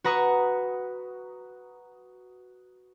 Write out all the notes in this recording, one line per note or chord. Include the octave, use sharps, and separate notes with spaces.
F#4 B4 A#5 C#6 D#6